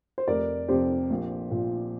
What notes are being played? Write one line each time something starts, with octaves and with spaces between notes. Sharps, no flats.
C5
F1 A#4 D5
F2 C3 G4 C5
A#1
A#2 F3